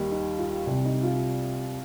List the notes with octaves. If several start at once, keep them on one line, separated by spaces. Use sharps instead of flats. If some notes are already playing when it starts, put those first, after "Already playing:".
Already playing: D#2 D#3 G3
D#4
F4
C2 C3 G3
D#4
F4